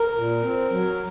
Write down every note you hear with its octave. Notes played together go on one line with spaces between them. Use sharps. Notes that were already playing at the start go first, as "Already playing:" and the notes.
Already playing: A#4
A#2
C4
F#3